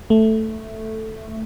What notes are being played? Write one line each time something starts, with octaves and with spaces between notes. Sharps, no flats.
A3